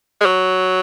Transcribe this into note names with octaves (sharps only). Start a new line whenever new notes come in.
G#3
F#3